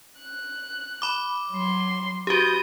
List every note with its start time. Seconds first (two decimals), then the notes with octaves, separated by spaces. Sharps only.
0.19 F#6
1.02 B5 D6
1.50 F#3 C6
2.27 F#4 G4 B4 D#6 G6